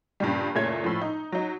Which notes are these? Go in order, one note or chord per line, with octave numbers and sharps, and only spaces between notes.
G2 A#2 C#3 G3
F#1 A#2 A3 C#5 G#6
A2 F3
D#4
F#3 D#4